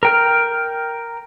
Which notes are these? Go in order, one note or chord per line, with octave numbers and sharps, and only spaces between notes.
A#4 G5 F6